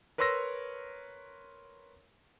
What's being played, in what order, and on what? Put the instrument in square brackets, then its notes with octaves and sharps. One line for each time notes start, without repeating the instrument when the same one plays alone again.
[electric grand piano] A#4 B4 C#5 C6 E6 A#6